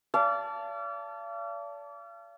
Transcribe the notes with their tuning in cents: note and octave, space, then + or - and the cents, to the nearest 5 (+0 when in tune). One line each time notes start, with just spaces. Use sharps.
D5 -35 F5 -40 A5 +0